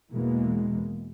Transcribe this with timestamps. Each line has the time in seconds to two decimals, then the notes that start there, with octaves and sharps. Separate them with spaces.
0.10 E2 B2 E3 G#3 A#3